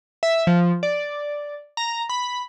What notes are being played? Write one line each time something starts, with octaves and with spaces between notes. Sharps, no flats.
E5
F3
D5
A#5
B5